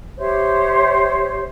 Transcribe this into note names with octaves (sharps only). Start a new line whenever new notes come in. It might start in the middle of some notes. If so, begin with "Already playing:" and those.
G4 C5 C#5 E5